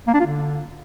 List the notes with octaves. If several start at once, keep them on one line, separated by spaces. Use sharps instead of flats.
A#3
D4
F4
D3